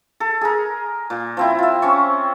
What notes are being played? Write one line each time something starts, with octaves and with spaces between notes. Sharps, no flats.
A4
G#4 A#4
A#2
F3 C4 E4
F4 E5
C4 C#4 C#6